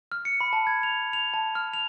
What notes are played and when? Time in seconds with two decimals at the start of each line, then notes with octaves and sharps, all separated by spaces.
0.12 F6
0.25 C#7
0.41 B5
0.53 A5
0.67 G#6
0.83 F7
1.13 F7
1.34 A5
1.55 F6
1.73 F7